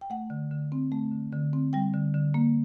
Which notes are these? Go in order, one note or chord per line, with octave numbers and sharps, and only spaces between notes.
G5
A3 F#5
D3
D3
C4
A3
D3
D3
C4
G3 G5
D3
D3
A#3